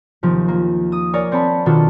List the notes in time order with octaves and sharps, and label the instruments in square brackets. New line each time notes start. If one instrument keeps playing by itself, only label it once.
[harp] D#2 C3 F3
A#3
D#6
A#4 C#5 D5 G#5
C4 C#5 A5 B5
B2 D#3 D4 F4 F#4 A4